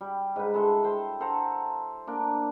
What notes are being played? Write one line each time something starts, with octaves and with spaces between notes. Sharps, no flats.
G3
G#2 B4
G#3 E4 A4 C6
C5 G5 A5
A4 C5 F#5 A#5
A#3 D4